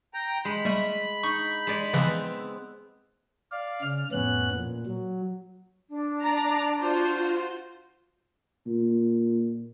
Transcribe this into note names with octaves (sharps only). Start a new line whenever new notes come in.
G5 A#5
G#3 B5
G3 A3
D#4 C#6
G#3 D5
C#3 E3 F3 B3 C4
D5 F5
C#3 F6
F2 A2 B3 C#4 F#6
A#2
F#3
D4
D5 A#5
F4 F#4 C5
A#2